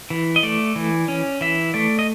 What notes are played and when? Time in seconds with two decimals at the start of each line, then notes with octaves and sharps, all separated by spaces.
0.10 E3
0.36 D#5
0.43 A3 D5
0.76 E3
1.08 C#4
1.41 E3 E5
1.74 A3 D5
1.99 D#5